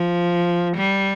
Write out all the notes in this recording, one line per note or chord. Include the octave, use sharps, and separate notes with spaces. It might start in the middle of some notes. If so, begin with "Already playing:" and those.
Already playing: F3
G3